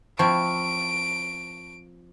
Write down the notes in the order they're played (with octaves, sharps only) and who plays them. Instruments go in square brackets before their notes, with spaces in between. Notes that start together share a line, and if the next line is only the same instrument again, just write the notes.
[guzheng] F3 C4 E4 [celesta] A5 C#6 [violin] D7